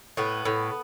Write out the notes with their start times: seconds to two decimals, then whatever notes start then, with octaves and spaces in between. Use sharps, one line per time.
0.17 A2 B3
0.45 A2